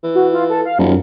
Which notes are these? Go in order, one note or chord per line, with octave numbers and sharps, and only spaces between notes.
E3
F#4
F4
A4
F5
D#1 F#2